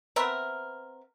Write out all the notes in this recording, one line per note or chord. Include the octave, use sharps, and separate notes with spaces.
B3 C4 A#4 E5